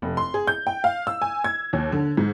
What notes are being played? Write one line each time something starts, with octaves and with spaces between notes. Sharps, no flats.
F1
C6
G#4
G6
G5
F5
E6
G#5
G#6
D#2
D3
G#2